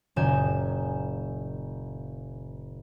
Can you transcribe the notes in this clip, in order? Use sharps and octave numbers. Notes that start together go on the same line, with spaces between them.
F#1 A#2 D#3 G#5 G6 E7